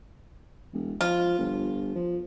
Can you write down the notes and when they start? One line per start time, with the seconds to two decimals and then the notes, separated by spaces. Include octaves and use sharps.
0.73 E1
1.01 F3 F4
1.39 G1
1.95 F3